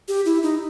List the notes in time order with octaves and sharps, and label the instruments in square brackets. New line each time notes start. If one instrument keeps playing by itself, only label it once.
[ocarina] G4
E4
D#4